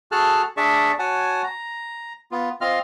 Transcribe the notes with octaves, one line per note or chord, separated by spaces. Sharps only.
F#4 G#4 A4 A5 F6 F#6
D4 G#4 D5 E5 A5 C#6
F#4 C#5 F#5 G#5 A5
A#5
B3 F4
C4 F4 D#5 F5 C6 F6